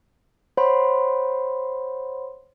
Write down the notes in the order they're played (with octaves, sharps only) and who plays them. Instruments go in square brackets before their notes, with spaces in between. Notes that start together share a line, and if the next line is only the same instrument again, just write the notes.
[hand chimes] C5 C#5 F#5 B5 C6